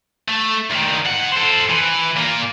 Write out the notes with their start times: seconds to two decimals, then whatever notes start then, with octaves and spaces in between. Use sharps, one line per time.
0.29 A3
0.71 D2 D#3
1.06 G#2 F#5
1.32 A4 C5
1.69 E3
2.16 A#2 A#3